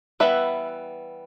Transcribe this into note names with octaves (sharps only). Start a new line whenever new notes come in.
E3 G3 B3 B4 E5